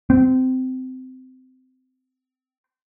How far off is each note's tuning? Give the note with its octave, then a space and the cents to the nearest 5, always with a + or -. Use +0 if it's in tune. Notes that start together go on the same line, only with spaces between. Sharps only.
C4 -20